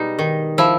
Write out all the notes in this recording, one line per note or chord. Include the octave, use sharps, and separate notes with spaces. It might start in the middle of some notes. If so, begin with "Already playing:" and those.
Already playing: B2 G3 G#3 D#4
D#3
F3 E4